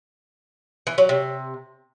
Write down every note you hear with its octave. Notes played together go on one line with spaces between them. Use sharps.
E3
F#3
C3